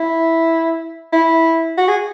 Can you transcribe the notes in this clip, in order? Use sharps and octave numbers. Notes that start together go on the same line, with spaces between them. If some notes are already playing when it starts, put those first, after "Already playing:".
Already playing: E4
E4
F#4
G#4